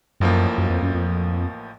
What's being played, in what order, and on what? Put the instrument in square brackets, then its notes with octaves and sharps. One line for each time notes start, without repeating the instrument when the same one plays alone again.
[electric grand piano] A1 A2 F3 A#3 [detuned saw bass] F#2
[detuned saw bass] F#2
F2
F#2
F2